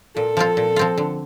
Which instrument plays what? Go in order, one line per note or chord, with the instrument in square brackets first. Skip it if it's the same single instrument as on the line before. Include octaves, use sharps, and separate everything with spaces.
[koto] A#2 [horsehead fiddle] A4
[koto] F3 C4 F4
A#2
F3 C4 F4
D3